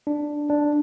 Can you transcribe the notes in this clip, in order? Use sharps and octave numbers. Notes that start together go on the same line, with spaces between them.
D4
D4